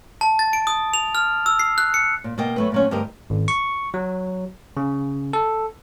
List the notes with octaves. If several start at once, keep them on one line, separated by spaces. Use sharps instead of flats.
A5
A6
D7
D#6
F7
F6
E6
C7
F#6
C#7
A#2
B2 A#3 D#5 G5
F#3 A3 B4
A#2 F#3 C#4
D2 G2 G4 A#4 D#5
G#1
C#6
F#3
C#3
A4